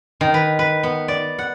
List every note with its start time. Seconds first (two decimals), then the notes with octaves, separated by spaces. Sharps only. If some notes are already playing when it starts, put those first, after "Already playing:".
0.21 D#3
0.34 B4
0.59 B4
0.83 B3
1.08 D5
1.38 F#5